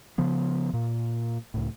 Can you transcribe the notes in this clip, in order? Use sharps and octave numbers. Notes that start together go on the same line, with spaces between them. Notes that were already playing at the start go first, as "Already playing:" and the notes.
C#3 F3 B3
A#2
C#2 A2